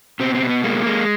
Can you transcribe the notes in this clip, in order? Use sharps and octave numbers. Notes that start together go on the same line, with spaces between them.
B2 C4
C4
B2
B3
G#3 A#3
G#3